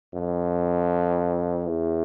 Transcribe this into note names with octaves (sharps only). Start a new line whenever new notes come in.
F2
E2